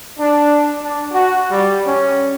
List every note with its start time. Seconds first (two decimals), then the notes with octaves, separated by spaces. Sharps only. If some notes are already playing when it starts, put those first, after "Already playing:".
0.20 D4
0.82 D4
1.13 F#4
1.51 G3
1.85 C#4